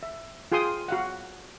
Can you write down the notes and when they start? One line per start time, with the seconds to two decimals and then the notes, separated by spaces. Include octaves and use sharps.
0.03 E5
0.52 F4 G#4 G5 C6 D#6
0.88 F#4 F5 F#5